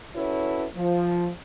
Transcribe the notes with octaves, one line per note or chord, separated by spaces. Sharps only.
C#4 E4 F#4 A4 B4 C#5
F3